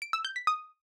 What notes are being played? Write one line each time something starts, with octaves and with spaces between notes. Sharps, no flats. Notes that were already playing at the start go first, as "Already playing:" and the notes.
D7
E6
G6
B6
D#6